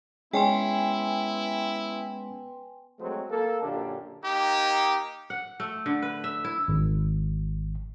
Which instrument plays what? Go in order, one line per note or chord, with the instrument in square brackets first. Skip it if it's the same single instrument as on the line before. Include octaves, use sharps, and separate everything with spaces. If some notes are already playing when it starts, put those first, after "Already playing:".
[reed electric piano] G#3 C#4 [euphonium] B3 [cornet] E4 [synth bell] G5 G#5 C6
[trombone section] F#3 G#3 A3 C4
A#3 A4
F#2 A#2 D3 A#3 D4 G4
[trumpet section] A#3 D#4 G4
[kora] F#5
A3
D3
B4
E5
E4
[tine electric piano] G#1